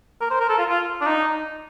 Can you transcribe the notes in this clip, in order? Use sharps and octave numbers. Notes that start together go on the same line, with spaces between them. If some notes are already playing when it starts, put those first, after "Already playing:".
A#4
C5
A#4
A4
F4
F4
D4
D#4